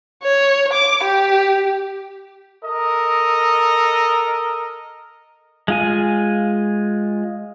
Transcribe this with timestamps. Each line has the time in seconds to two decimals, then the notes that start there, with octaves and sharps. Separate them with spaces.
0.23 C#5
0.73 D6
1.04 G4
2.64 A4 A#4 D#5
5.68 G#3 F4 G#5